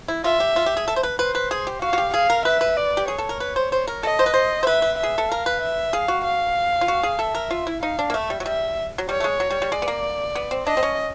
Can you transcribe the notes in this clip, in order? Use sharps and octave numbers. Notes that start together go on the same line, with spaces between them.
E4
F4 E5
G4
F4
G4
G#4
A4
C5
B4
B4 C5
B4
G#4
G4
F#4 F5
F#4
G4
G#4 F5
A#4
B4 E5
B4
D5
G4
G#4 C#5
A4
A#4
B4
C5
C5
A#4
A4 D#5
C5
B4
C5
C5
B4 E5
B4
G#4 E5
A4
A#4 F5
B4
E5
G#4 F5
F#4
F5
F4
F#4
G#4
A4 E5
A#4
F4
E4
D#4 F5
D4
A#3
A3 E5
G3
F#3
G3 E5
F#3
G3 C#5
A3
G#3
F#3
G3
G3
G#3 D5
B3
A#3
B3
C4
D4 D#5
C4
C#4